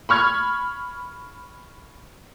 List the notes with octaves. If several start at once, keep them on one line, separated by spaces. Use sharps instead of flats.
B5 C#6 F6 G#6